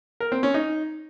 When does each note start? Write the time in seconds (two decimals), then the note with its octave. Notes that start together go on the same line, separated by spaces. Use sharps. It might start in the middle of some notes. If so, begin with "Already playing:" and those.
0.20 A#4
0.32 C4
0.43 C#4
0.54 D#4